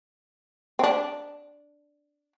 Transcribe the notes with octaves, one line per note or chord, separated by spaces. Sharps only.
C4
D4